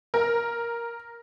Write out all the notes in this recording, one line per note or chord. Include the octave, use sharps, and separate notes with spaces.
A#4